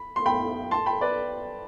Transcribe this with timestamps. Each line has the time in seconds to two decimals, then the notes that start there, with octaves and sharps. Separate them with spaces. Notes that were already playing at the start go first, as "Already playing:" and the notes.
Already playing: B5
0.16 C6
0.26 G5 B5
0.71 A5 C6
0.86 G5 B5
1.01 B4 D5